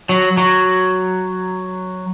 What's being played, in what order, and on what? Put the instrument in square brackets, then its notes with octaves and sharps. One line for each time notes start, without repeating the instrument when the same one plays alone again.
[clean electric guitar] F#3
F#3